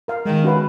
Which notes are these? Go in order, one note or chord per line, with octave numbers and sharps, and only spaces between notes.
A#4 F5
D#3 G#3
C#4 F#4 B4 F5